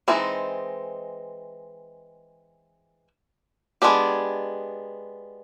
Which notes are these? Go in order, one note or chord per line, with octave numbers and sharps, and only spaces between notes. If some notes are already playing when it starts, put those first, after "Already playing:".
E3 G#3 C4 D#4
G#3 B3 D4 G4